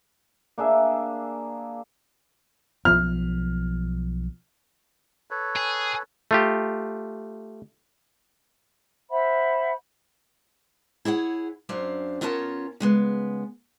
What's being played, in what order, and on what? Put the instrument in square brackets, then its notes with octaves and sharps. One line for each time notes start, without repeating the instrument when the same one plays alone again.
[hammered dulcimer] A#3 D4 G#4 E5
[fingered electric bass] B1 F3 B3 [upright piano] F6
[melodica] A4 B4 C#5
[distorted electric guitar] G#4
[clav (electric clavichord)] A3 F4 G4
[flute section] C5 E5 F#5 B5
[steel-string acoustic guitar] E4 G#4 C#5 F#5
F#2 C#4 D4 C5 F5
B3 C#4 F4 A#4 C#5 A5
C#3 G#3 B3